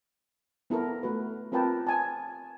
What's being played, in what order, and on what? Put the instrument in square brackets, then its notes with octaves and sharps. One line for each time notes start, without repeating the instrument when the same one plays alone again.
[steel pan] B3 E4 A4 A#4
A3 F#4 B4
C4 F4 A#4 B4 G5 A5
G#5 A5